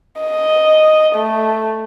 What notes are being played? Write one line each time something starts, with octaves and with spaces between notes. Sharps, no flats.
D#5
A3